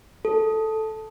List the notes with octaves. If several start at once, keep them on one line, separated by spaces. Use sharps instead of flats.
A4